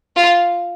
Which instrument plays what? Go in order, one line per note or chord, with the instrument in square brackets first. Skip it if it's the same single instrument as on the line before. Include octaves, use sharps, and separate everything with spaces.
[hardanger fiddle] F4